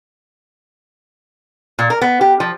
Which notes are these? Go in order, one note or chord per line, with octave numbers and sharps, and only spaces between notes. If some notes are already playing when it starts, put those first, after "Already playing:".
A#2
A#4
B3
G4
F3